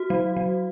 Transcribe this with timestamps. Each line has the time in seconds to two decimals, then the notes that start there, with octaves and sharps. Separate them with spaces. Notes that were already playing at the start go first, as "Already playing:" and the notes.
Already playing: F#4
0.10 F#3
0.37 F#3